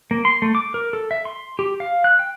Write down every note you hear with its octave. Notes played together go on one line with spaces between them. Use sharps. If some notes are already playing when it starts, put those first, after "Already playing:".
A#3
C6
A3
D6
A#4
A4
E5
C6
G4
F5
F#6
G5